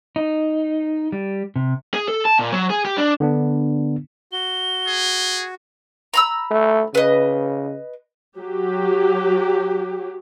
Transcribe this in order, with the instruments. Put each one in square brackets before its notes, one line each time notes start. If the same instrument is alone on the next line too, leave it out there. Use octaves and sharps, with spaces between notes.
[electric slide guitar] D#4
G3
C3
[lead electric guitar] G#4
A4
A5
A#2
F#3
G#4
G4
D4
[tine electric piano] D3 B3 D4
[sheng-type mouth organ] F#4 [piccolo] G7
[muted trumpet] G#4
[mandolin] A#5 B5 E6
[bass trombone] A3
[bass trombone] C#3 [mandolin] B4 D#5
[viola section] F#3 G4